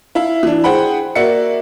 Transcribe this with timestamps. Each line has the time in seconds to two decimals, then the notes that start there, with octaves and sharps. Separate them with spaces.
0.15 E4 E5 F5
0.43 E3 D4
0.64 G#4 C5 F#5 G5 B5
1.15 A#3 F#4 D5 E5 C#7